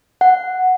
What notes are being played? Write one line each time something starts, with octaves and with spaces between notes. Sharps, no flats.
F#5